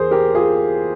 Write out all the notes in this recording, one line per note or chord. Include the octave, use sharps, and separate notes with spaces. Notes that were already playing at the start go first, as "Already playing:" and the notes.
Already playing: E2 G#4 A#4 C5
G4 A#4
F4 G#4